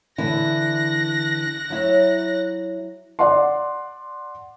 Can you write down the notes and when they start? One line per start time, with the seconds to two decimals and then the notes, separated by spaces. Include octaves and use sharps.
0.18 D3 E3 E4 F#6 A#6
1.70 F#3 E4 C#5
3.19 D5 F#5 C6